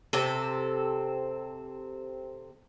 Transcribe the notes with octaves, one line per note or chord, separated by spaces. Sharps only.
C3 C4 A4